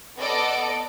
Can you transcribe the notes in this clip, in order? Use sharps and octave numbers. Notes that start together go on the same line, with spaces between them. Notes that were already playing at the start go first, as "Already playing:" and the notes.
B3 A4 D5 D#5 D7